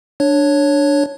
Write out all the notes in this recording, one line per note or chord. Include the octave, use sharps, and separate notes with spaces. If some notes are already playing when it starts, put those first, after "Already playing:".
D4 C#5